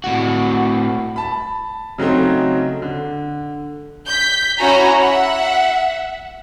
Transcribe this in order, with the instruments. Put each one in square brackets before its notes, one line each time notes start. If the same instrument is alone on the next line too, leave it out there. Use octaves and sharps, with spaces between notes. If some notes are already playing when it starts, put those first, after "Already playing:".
[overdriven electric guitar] A2 F#4
[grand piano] A5 B5
C#3 F#3 A3 C4 D#4
D3
[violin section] G6 B6
C#4 E4 F#4 G#5 A#5
E5 F#5